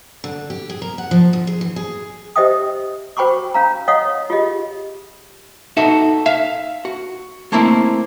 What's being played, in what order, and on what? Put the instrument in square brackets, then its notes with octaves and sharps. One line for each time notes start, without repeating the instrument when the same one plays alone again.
[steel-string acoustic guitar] D3
G4
G#4
A#4
F#5
F3
D2
G#4
E3
G#4
[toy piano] G4 C5 D#5 E5 G5 D#6
F#4 C5 G5 B5 C#6 D6
C#4 F5 A#5
C#5 D#5 F5 F#5 D#6
F4 G4 G#4 D#5
[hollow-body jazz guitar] D#4 F#4 A4 E5
E5 F5
F#4
A3 A#3 C4 E4